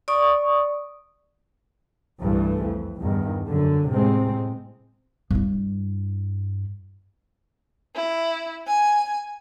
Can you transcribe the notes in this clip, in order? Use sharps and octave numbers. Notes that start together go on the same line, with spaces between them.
D5 C#6 D#6
C2 G2 E3 A3
F2
E2 G2 D#3
F#2 D3
A2 C3 G#3 C4
G2 E4
E4
G#5